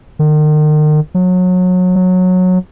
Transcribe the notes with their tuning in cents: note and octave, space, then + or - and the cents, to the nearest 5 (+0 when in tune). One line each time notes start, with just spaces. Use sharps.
D#3 -40
F#3 -25
F#3 -15